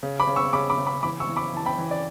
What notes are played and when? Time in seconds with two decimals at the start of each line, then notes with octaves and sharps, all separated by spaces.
0.03 C#3
0.20 B5 D6
0.27 C#3
0.36 C#6 E6
0.53 C#3 B5 D6
0.70 B5 D6
0.78 C#3
0.86 B5 D6
1.03 E3 B5 D6
1.20 C#6 E6
1.28 E3
1.36 B5 D6
1.54 E3 A5
1.66 G5 B5
1.78 E3
1.91 D5